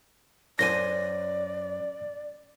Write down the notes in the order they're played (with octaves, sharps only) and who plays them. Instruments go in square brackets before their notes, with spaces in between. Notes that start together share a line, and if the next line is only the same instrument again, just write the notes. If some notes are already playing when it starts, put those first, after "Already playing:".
[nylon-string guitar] F#2 C5 G#5 [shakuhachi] D5 [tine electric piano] A#6